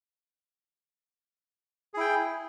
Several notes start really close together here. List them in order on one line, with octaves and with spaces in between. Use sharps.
G#4 E4 G5